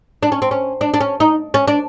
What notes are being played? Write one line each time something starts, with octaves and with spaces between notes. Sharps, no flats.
D4
C#4
C4
C#4
D4
D4
C#4
D#4
C#4
D4